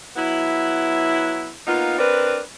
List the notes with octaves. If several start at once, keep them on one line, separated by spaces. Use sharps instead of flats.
F#3 B3 E4
A#3 B3 D#4 F4
C4 D4 A#4 B4